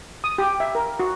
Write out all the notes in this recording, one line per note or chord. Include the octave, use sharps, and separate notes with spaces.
D#6
G4
E5
A#4
F#4